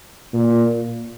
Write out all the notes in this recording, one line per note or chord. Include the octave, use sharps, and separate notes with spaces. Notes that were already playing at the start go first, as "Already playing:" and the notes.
A#2